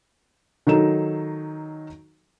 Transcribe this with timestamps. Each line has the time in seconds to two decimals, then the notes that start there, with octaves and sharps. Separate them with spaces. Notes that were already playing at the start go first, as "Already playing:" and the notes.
0.67 D#3 F#3 D#4 A4 E7